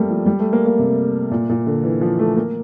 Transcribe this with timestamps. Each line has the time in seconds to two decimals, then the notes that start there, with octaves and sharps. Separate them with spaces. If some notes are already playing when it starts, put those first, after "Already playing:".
Already playing: G3 A3 A#3 C4
0.09 F3
0.26 G3
0.39 A3
0.53 A#3
0.66 A#3
0.79 C3
1.31 A#2
1.49 A#2
1.67 D3
1.84 E3
2.01 F3
2.19 A3
2.36 A#3